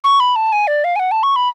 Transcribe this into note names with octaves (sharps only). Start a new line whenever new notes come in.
C#6
B5
A5
G#5
D5
F5
G#5
F#5
A5
C#6
B5